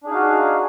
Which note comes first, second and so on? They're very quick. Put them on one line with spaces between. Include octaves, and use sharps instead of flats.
D4 G#4 D#4 F5 F#4